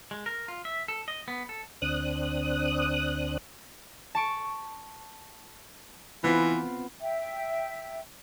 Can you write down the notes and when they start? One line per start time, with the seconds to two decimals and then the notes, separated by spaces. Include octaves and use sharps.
0.11 G#3
0.26 A#4
0.48 F4
0.65 E5
0.88 A4
1.08 D#5
1.28 B3
1.49 A4
1.82 D2 C4 D4 D#6 F#6
4.15 A5 C#6 D7
6.24 E3 B3 C4 F4
7.01 E5 G5